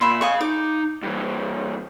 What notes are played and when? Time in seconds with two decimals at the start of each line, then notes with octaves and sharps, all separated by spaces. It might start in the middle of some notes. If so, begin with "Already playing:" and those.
0.01 A#2 E5 B5 C6
0.21 G#4 D#5 F5 G#5 C#6
0.41 D#4 D6
1.03 G2 E3